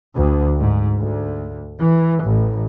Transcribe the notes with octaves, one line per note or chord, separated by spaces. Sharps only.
D2
G#2
D2
E3
A1